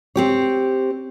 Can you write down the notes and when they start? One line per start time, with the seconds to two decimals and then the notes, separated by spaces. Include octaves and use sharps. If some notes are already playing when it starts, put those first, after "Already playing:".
0.16 C4 G4 C#5